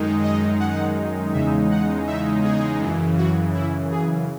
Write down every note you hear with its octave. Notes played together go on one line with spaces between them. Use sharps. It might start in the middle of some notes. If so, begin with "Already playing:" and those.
Already playing: F#2 D#3 G#3 D#4
D#5
F#5
E2 C#3 G#3 D#4 E5
F#5
E5
G#4
F#2 C#3 E3
F#4
E4
G#4